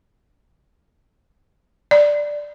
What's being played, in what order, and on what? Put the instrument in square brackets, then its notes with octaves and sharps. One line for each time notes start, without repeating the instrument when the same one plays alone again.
[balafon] D5